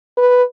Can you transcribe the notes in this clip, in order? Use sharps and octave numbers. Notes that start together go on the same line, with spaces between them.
B4